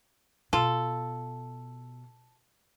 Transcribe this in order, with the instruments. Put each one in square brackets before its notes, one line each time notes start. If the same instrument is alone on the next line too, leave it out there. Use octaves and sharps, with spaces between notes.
[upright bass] B2 [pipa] F4 A4